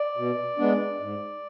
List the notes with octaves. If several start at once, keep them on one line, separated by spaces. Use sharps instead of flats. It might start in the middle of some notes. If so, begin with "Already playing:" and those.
Already playing: D5
B2
G#3 B3 D4
G#2